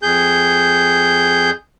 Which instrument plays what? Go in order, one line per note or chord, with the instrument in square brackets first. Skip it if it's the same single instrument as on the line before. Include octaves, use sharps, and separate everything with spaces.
[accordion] F2 G#4 G6